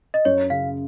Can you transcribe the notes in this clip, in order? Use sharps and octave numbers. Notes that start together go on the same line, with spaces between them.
D#5
F#2 C#5
C#3 F5